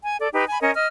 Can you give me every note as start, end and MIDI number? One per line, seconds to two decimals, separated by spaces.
0.02 0.16 80
0.19 0.28 69
0.19 0.28 74
0.33 0.44 63
0.33 0.44 67
0.33 0.44 71
0.49 0.61 80
0.49 0.61 83
0.61 0.71 61
0.61 0.71 70
0.61 0.71 73
0.61 0.71 75
0.75 0.86 75
0.75 0.86 89